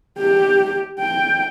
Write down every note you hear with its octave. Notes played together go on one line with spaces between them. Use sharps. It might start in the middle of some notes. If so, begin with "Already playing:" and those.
G4
G5